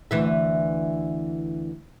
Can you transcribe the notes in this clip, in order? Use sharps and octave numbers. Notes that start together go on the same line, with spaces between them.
D2 E3 E5